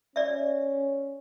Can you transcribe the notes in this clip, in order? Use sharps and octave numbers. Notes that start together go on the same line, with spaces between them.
C#4 D5 E5